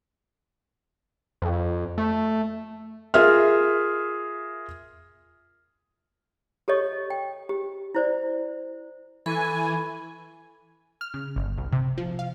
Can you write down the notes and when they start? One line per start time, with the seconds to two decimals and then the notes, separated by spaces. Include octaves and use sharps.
1.42 F2
1.98 A3
3.14 F4 G#4 A#4 E5 F6
6.68 G4 A4 C#5 D#5 C#6
7.10 G5
7.49 G4
7.95 E4 C5 D5
9.26 E3 A4 G#5 B5 C#6
11.01 F6
11.14 C#3
11.36 G1
11.58 C2
11.72 C3
11.98 F3
12.19 F5